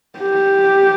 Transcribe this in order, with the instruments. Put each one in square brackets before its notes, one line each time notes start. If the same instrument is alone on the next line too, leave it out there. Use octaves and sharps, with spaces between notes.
[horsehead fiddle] G4